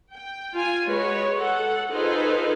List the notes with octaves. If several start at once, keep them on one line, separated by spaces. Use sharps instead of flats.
G5
F4 G#5
G#3 F#4 B4 C#5
A4 F#5
D#4 F4 G#4 A4 B4 C5